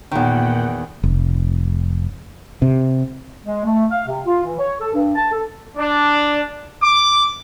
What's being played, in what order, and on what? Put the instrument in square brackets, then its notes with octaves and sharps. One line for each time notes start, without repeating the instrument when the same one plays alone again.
[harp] E2 D#3 [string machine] A#2 F#5 G5
[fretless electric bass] F1
C3
[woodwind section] G#3
A3
F5
C3
F4
E3
C#5
A4
G2
A5
A4
[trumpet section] D4
D6